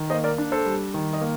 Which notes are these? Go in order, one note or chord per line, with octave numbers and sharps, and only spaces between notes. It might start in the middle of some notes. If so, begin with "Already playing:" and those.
Already playing: D#3
A#3 C5 D#5
A#4 D5
D4
A4 C5
G3
D#3
D#5
A#3